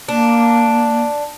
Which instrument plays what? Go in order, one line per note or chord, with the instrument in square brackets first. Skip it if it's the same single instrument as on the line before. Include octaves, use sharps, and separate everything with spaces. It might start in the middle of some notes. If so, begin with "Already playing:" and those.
[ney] A#3 [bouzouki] D4